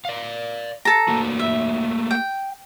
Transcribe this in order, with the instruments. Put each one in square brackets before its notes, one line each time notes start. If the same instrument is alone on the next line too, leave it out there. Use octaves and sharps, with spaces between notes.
[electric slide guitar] D5 F5
[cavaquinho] A4 A#5
[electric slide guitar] A3 A#3 F#4
[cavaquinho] E5
G5